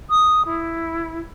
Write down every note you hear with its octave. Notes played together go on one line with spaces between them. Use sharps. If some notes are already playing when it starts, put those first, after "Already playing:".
D#6
E4